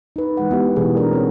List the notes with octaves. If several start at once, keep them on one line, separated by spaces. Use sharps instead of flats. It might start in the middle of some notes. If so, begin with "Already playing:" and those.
D#4 B4
E3 G#3 F#5
B3 E4 G4
B2 E3 G3 A3 G4 G#4
E3 A3 D4 A#4 D5
C4 C#5